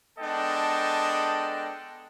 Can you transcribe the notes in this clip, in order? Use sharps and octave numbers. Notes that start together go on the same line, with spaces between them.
G#3 B3 D4 A4 D#5 G5